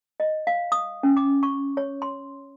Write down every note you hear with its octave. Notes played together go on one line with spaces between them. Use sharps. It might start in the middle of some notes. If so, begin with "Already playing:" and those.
D#5
F5
D#6
C#4
D6
C#6
C#5
C6